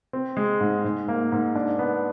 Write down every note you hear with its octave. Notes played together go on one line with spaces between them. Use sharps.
C4
G#3
G#2
G#2
A#3
G#2
D4
B3